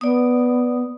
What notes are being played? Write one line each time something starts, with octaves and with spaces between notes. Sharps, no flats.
B3 D5 D#6